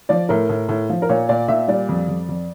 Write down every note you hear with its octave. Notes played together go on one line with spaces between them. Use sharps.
F3 D5
A2 A#4
A2
A2
F3
A#4
A#2 C#5
A#2 D5
A#2 E5
G3 D5
F2
F2
F2